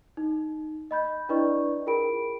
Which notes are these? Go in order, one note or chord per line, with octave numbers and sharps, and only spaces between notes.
D#4
D#5 B5 G6
D4 E4 B4 D5 D#5 C#6
F4 G#4 A#4 G5 B5 D7